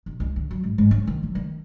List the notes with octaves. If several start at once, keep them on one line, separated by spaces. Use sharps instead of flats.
B1
C#2
D3
F#3
G#2
G#2
C#4
D#3
F#3
D#3